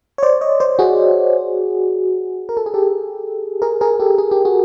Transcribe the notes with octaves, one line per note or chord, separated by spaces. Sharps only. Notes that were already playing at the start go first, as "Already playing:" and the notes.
C#5
C5 D5
C#5 D#5
C5 D5
F#4 G#4
A#4
A4
G#4
G4 A4
G#4 A#4
G#4 A#4
G4 A4
G#4
G4
F#4 G#4